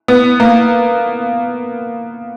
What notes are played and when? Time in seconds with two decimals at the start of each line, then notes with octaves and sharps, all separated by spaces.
0.08 B3
0.40 A#3